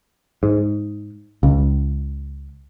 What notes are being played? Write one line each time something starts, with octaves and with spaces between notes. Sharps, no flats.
G#2
C#2